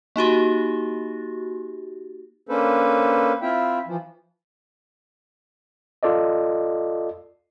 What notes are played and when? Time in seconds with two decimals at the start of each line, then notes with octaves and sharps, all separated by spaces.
0.16 A#3 D#4 F#4 G4
2.49 A#3 C#4 D4 A4 B4 C5
3.42 C4 E4 F4 E5 G5
3.87 E3 F3
6.03 F4 A4 D5 D#5